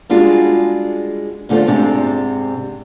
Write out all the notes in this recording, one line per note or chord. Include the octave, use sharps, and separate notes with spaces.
G3 G#3 D4 F4 F#4 G#4
E2 D3 A3 F4 C5
G#2 C3 C4 D4